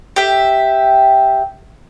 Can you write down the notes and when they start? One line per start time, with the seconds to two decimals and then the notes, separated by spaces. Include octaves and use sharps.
0.16 G4 E5